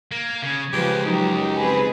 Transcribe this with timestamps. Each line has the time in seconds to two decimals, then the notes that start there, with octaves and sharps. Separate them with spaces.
0.12 A#3 G#6
0.42 C#3
0.73 C#2 F3 G4 G#4 B4
1.06 F#2 F#3 D#4 G4
1.57 C4 G#4 B4